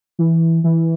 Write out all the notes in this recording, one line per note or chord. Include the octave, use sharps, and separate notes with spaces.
E3
E3